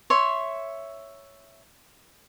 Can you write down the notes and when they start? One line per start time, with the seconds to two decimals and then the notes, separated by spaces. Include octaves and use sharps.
0.10 C#5 E5 C6